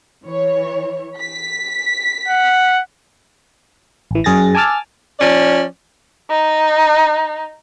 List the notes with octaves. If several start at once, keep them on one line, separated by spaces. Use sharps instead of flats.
E3 C#5
B6
F#5
A1 E3
F#2 G#4 A6 A#6
G#5 A5 D6 E6 F6 A6
F3 C#4 D5
D#4